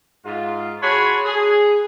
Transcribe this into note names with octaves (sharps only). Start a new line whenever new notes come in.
G#2 F4
F#4 G#4 C#5 A5 B5 C6
G#4